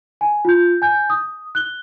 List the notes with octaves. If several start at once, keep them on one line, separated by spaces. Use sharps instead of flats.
G#5
F4 G6
G#5 G6
D#6
F#6 G7